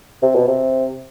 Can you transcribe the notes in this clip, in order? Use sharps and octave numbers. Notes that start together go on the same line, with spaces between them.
C3
B2
C3